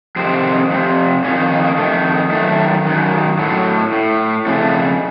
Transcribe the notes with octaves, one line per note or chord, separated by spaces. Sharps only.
F2 C3 D#3 C4
F2 C3
F2 D#3 C#4
D#4
D#4
A#3
F2 D#3 A3
F#2 D#3 A3
F#2 D#3
A2 F#3
A2
F2 C#3 A3